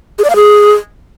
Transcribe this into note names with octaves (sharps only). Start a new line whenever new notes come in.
G#4
D5
F5
G#4